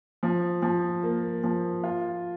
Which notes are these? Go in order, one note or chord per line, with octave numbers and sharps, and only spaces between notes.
F3
F3
A#3
F3
F4